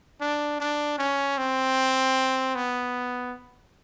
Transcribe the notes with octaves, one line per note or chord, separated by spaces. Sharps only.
D4
D4
C#4
C4
B3